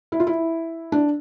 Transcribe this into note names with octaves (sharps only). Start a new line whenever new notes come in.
E4
F4
E4
D4